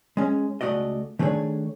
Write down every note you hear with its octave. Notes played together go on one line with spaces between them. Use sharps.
G#3 C#4
C#2 F3 A3 F#4 D5 D#5
D#3 A3 D4 G#4 C#5